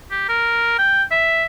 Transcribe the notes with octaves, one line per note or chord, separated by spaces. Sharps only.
G4
A#4
G5
E5